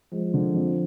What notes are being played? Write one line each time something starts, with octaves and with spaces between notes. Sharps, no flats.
F3 G#3
D3
F2